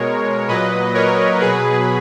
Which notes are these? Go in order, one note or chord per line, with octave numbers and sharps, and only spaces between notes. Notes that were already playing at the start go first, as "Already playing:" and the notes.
Already playing: B2 G#3 A#4 C#5
A#2 F#3 B4 D#5
A#4 C#5
B2 F#3 G#4 B4